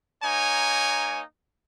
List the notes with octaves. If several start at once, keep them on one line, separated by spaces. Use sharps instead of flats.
A#3 D#4 C#5 G#5